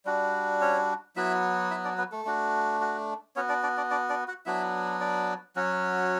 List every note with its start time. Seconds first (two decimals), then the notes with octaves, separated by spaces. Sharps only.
0.05 G3 D4 F#4
0.61 C#4 C#5
1.16 F#3 B3 E4 F#4 E5
1.71 E4 E5
1.84 D4 D5
1.98 B3 B4
2.12 A3 A4
2.25 A3 D4 F#4
2.81 F#4
3.36 B3 C#4 F#4 C#5
3.49 D4 D5
3.63 D4 D5
3.77 D4 D5
3.91 D4 D5
4.09 D4 D5
4.28 F#4 F#5
4.46 F#3 B3 D4 E4 F#4 E5
5.00 D4 D5
5.56 F#3 C#4 F#4